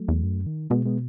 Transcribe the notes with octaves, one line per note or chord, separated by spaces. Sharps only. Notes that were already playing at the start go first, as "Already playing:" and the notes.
Already playing: F#3 A3
E2
F#2
D#3
B2 G#3 B3
G#3 B3